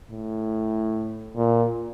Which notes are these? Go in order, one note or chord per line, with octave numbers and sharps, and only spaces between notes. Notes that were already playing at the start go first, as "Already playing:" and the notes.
A2
A#2